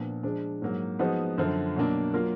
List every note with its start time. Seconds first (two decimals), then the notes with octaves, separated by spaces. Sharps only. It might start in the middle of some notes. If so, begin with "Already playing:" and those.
Already playing: A#2 F3 B3 D4
0.23 F3 G#3 D4
0.62 G#2 F#3 A#3
0.99 F3 G#3 B3 D#4 F#4
1.38 F#2 D3 F3
1.76 B2 F#3 A#3 D4
2.14 F#3 A#3 F4 A#4